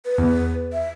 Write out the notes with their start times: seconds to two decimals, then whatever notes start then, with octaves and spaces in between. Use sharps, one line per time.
0.05 B4
0.18 E2
0.73 E5